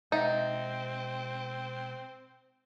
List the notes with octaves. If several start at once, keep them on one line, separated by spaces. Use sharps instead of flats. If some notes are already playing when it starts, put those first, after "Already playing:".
B2 G#3 C4 D#4 D#5 E5 F#5